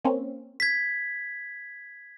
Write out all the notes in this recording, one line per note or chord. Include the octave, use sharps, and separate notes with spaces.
A#3 C4 C#4
G#6 B6